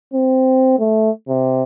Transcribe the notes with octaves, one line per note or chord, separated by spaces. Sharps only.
C4
A3
C3